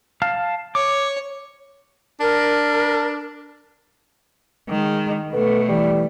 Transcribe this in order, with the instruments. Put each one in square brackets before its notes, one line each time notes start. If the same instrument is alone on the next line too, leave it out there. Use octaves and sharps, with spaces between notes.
[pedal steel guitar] F5 A5 F6
[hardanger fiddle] C#5 [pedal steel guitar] D6
[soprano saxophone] D4 [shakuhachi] A#4
[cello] D#3 [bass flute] G#3
[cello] B2 A3 [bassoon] B3 [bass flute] A4
[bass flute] E3 [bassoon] G3